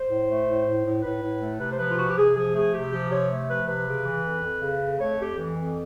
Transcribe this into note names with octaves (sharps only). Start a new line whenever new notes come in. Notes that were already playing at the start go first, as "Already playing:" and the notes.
Already playing: C5
A2
A3
A2
A2
A2
A2 B4
A2
A3
C3 B4
C5
F3 B4
F4
C3 F#4
G4
C3 G#4
F3 G#4
A3 G#4
C3 G4
F3 G4
C3 C#5
A3
F3 B4
C3 B4
C#3
E3
F2
F2
C#3
F2
A3 C#5
F2 G4
E3
F2